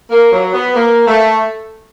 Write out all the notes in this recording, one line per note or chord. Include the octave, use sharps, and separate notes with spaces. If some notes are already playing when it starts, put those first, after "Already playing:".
A#3
F#3
B3
A#3
A3